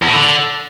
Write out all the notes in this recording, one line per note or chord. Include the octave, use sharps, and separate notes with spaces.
E2
A2
D3